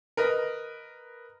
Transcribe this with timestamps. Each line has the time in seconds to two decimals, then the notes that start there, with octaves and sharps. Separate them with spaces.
0.17 A#4 B4 D#5